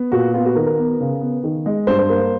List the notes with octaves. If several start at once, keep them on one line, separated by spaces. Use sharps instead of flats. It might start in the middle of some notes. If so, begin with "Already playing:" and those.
Already playing: B3
A#2 F#4
B3 F4
F#4
D#3 A#4
A#4
B3
C#3
B3
D#3
G#3
G2 C5
C5
A#3